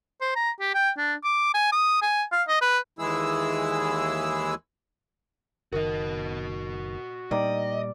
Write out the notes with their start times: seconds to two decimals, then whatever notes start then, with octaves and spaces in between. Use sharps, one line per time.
0.21 C5
0.36 A#5
0.60 G4
0.74 G5
0.98 D4
1.24 D6
1.54 G#5
1.72 D#6
2.02 G#5
2.32 F5
2.48 D#5
2.61 B4
2.99 D#2 E3 G#3 E4 G#4 E6
5.73 F#1 D#3 F#4 A#4 D#5
7.31 A#2 G3 D#4 D5 D#5 G5 A#5